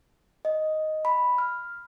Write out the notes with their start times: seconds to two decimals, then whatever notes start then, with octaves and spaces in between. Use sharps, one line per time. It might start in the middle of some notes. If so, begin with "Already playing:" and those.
0.45 D#5
1.05 B5
1.38 F6